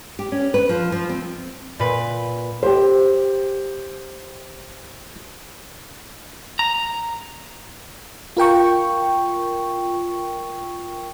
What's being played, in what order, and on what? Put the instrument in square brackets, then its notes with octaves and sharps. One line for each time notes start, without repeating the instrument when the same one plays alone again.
[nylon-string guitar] G4
C#4
B4
F3
F3
C4
[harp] A#2 B4
[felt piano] G4 C5
[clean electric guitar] A#5
[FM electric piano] F4 A#4 G5 C#6